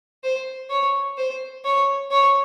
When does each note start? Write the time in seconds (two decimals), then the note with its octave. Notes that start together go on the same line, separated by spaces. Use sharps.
0.24 C5
0.70 C#5
1.18 C5
1.65 C#5
2.11 C#5